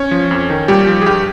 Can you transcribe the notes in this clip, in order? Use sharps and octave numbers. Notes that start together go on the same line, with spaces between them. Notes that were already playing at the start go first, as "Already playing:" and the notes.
Already playing: C#4 C#5
F3
F2
D#3
A#2 G3 G4
F3
G#4
G2 G3 G4